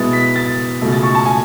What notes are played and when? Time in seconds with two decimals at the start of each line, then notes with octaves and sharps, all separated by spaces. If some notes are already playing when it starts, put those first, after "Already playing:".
Already playing: B2 G#3 B3 E4 A6
0.13 B6
0.36 A6
0.82 C#2 B2 A3
0.92 A6
1.03 C#6
1.15 A5
1.26 G#5